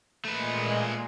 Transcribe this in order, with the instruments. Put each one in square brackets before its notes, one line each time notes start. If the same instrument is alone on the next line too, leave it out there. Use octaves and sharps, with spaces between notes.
[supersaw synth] A#2 G#3 [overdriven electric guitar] A3 B4